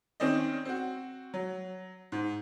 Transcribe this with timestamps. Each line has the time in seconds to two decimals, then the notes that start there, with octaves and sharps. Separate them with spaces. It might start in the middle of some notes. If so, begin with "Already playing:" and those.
0.20 D#3 C4 C#4 D5 D#5
0.65 C4 F#4
1.34 F#3
2.12 G#2